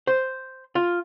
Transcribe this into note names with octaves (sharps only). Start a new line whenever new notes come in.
C5
F4